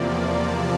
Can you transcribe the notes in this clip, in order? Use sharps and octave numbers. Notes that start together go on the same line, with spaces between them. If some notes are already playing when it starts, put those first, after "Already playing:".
Already playing: E2 C3 F3 A#3 D5
A5